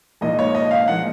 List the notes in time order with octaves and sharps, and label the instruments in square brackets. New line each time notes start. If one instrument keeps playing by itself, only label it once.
[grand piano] A#1 A#2 F3 G#3 D#4 D#5
C#5
D#5
F5
A#2 F3 G#3 D#4 F#5